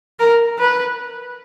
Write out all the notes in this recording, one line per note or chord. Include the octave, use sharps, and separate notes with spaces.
A#4
B4